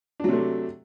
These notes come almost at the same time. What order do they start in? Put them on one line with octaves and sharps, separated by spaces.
D4 F#3 C3 A3